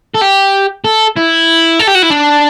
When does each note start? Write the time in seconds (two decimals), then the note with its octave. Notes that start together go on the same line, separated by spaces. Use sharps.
0.14 A4
0.21 G4
0.84 A4
1.16 E4
1.80 A4
1.88 G4
1.95 F#4
2.03 E4
2.11 D4